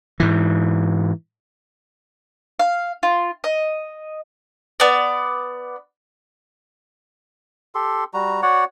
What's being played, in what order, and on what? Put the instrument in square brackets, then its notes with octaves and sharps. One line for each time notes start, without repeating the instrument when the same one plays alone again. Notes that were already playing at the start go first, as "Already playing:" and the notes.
[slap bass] G#2 E3
[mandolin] F5
F4
D#5
B3 D5
[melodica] G4 A4 C6
G3 F#4 A#5
F#4 C#5 D5 F#5